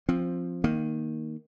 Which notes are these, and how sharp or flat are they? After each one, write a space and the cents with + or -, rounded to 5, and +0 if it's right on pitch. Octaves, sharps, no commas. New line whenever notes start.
F3 +0 C4 +10
D#3 +0 A#3 +0